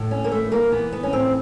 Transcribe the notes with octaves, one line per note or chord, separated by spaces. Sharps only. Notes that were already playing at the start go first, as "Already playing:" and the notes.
Already playing: A2
C#4
A#3
E3 A3
A#3
E3 B3
B3
C#4
A2 C4